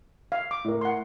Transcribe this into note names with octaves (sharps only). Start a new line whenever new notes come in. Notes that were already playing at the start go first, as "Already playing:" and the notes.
F5
D6
A2 A#4
F#5 C6